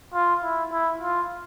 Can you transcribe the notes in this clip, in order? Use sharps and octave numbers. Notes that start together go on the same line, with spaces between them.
F4
E4
E4
F4